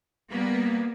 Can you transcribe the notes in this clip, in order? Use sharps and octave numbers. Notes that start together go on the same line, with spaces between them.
G3 A#3 B3